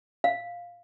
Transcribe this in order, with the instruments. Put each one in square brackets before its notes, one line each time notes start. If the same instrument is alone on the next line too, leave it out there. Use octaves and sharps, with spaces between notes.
[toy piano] F5